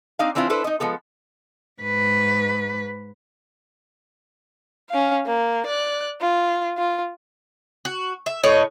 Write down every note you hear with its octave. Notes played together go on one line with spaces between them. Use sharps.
C4 D4 D#4 F5
E3 C4 D4 E4 F4
D4 E4 A4 B4 C5
D#4 D#5
F3 G#3 B3 A4
G#2 B4
C#4 F5
A#3
D5 F#6
F4
F4
F#4
E5
A2 C#5 D#5